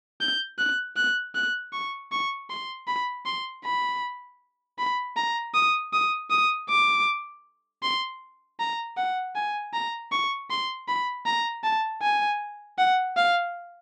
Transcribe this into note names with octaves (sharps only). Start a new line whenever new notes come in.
G6
F#6
F#6
F#6
C#6
C#6
C6
B5
C6
B5
B5
A#5
D#6
D#6
D#6
D6
C6
A#5
F#5
G#5
A#5
C#6
C6
B5
A#5
A5
G#5
F#5
F5